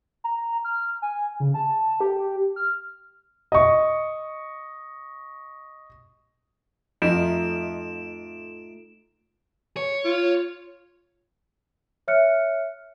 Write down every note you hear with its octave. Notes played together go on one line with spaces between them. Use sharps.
A#5
F6
G#5
C#3
A5
G4
F6
D#5 C#6
F2 A3 D#4 F4 D7 E7
C#5
F4
C#5 E5 F6 F#6 C#7